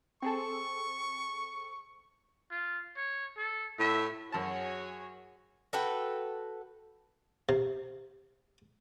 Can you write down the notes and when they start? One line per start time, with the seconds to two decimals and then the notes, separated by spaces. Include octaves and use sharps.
0.22 C4 G#4 A4 C#6
2.51 F4
2.96 C#5
3.37 A4
3.79 A2 E5
4.32 F#2 F#4 G#4 C#5 A5
5.73 F#4 A4 B4 G5
7.49 C3